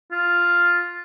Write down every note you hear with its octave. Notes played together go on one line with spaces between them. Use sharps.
F4